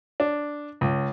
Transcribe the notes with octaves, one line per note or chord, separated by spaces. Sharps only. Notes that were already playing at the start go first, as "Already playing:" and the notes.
D4
C#2